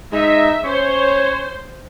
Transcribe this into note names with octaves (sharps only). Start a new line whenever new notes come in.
G#3 D#4 E5
C#4 C5 C#5